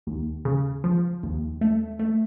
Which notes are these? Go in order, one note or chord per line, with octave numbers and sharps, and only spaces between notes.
D#2
C#3
F3
D#2
A3
A3